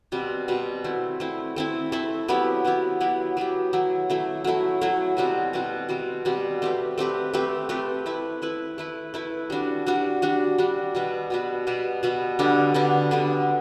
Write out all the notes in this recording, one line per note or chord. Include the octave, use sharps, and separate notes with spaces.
B2 G3 C4
B2 G3 C4
A3 C4 E4
A3 C4 E4
A3 C4 E4
A3 C4 E4
F#3 B3 E4 G4
F#3 B3 E4 G4
F#3 B3 E4 G4
F#3 B3 E4 G4
F#3 A3 E4
F#3 A3 E4
F#3 A3 E4
F#3 A3 E4
B2 G3 C4 F#4
B2 G3 C4 F#4
B2 G3 C4 F#4
B2 G3 C4 F#4
A3 C4 G4 B4
A3 C4 G4 B4
A3 C4 G4 B4
A3 C4 G4 B4
A3 E4 B4
A3 E4 B4
A3 E4 B4
A3 E4 B4
G3 D4 F#4
G3 D4 F#4
G3 D4 F#4
G3 D4 F#4
B2 G3 B3 F#4
B2 G3 B3 F#4
B2 G3 B3 F#4
B2 G3 B3 F#4
D3 G3 B3 D4
D3 G3 B3 D4
D3 G3 B3 D4